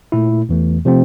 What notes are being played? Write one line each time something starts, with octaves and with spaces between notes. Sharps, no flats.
A#2 A3 E4
E2 E3 A3
C3 F3 A3 C4